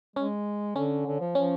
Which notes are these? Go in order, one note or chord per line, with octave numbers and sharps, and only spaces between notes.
G#3 C#4
D3 C#4
D3
F3
F3 C#4